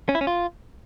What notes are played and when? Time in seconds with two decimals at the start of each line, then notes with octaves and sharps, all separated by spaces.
0.09 C#4
0.15 E4
0.21 C#4
0.27 F4